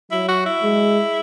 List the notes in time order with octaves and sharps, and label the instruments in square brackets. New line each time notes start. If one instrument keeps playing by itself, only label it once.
[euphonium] F#3 [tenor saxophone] E4
[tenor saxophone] F#4
E4
[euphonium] G#3